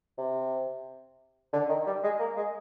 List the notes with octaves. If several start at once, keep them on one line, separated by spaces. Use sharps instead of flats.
C3
D3
D#3
G3
G#3
A#3
G#3